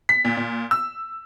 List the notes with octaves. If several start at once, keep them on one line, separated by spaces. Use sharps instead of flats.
B6
A#2
A#2
E6